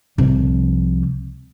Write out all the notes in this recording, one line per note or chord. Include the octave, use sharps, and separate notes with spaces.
C2 F3